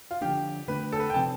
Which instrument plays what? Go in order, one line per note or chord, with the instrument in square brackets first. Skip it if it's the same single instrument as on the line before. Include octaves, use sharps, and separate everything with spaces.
[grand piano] F4
[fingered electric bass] D3 F3 B3 D4 [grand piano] G4
[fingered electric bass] D3 A3 D4 [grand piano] B4
[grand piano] A4
B4
G5
[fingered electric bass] C3 F3 C4 [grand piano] A5